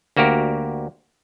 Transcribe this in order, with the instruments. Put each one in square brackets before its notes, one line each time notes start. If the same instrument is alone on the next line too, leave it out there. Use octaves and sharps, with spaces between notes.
[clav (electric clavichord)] D2 A#3 F#4 G4 A#4